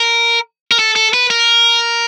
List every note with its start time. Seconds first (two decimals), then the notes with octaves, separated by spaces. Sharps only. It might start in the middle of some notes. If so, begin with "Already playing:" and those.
Already playing: A#4
0.71 A#4
0.79 A4
0.96 A4
1.14 B4
1.30 A#4